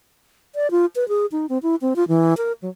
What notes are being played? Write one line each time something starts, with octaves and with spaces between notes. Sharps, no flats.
D5
F4
B4
G#4
D#4
C4
E4
C4
F4
E3
A#4
F#3